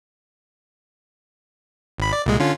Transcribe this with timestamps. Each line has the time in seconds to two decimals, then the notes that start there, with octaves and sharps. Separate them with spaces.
1.98 G#1 B5
2.13 D5
2.26 C2 A#2 G#3
2.40 D3 C#4 F4